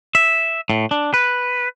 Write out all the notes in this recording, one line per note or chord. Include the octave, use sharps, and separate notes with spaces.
E5
A2
D4
B4